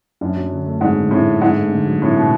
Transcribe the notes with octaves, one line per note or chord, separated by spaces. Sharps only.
F#2 D4
F#3
D3
A3
G#2 D4
D3
A2 D3
A3
G#2 D4
A3
D3
F#3
A2 D4
B2 A3